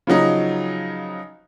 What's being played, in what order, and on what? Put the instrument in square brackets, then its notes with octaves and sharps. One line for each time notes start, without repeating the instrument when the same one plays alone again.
[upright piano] C#3 F3 F#3 D#4